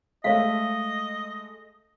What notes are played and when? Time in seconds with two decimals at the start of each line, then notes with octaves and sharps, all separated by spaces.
0.24 G#3 A3 C#5 D#5 F5